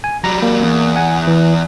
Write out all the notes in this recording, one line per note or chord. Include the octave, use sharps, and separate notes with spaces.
G#5
F#3 G3 A#5
A#3
E2
F#5 G#5
E3